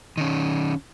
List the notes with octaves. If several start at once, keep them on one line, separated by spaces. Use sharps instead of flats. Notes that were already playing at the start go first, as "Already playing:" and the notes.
D#3 C#4